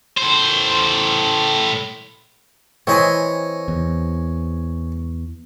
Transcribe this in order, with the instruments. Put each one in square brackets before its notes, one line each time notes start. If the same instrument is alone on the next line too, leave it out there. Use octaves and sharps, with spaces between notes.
[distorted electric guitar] A2 C5
[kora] E3 C4 [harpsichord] C#5 D#5 G#5
[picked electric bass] E2